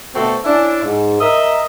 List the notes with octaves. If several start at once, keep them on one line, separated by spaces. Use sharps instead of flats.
B2 D3 A3 C4 F#4 A4
C#4 D4 E4
G#2
A#4 D#5 E5